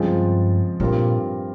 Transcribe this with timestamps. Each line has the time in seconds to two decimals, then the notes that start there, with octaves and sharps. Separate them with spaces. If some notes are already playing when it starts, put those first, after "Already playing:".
Already playing: G2 C#3 F3 G#3 C4 F4
0.80 G2 A#2 G3 C4 F4 A#4